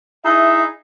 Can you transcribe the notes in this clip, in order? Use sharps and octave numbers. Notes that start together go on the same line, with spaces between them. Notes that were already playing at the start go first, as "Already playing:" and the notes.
D#4 E4 G#4 E5